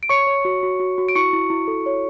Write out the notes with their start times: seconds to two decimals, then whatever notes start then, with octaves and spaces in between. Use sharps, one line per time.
0.03 D7
0.09 C#5 C#6 C#7
0.27 C#5
0.45 F#4
0.63 F#4
0.80 F#4
0.98 F#4
1.09 D7
1.15 E4 C#6 C#7
1.33 E4
1.50 E4
1.68 A4
1.86 C#5